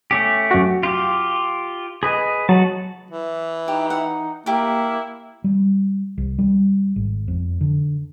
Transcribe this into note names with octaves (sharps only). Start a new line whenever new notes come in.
A3 C#4 G4
F#2 F#4
F4 G4
G#4 B4 D#5
F#3 F#4 A5
E3
D#4 G4
F#5
A#3 E4 G4 A#4
G3
C2
G3
G#1
F2
D3